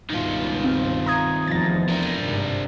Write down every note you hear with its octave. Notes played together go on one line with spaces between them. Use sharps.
C#2 G2 B2 D#3 F4
C4 F5
A#5 D#6 G#6
F1 E2 F3 A6 A#6
D4 A#4
G#1 G2 C3